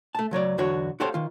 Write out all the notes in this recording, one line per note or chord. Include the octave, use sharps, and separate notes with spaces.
A3 A5
C#2 F#3 C#5 D5
B1 E2 D3 D4 F#4 C#5
F#4 G4 A4 C5 C#5 F5
D#3 F4